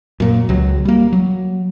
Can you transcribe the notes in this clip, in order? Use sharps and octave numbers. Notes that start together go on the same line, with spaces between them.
F#2 A#2
C#2 F#3
G3 A#3
F#3